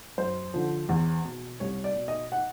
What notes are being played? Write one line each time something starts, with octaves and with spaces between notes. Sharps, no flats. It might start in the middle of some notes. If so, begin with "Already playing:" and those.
F#2 C5
D3 F3
E2
B2
C2 C#5
D5
B2
D#5
F#5